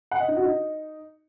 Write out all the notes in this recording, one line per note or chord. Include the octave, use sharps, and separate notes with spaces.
F#5
D#5
D#4
F#4
D#4